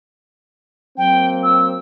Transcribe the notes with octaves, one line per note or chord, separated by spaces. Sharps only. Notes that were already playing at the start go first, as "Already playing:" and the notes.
F#3 A#3 C4 G5
E6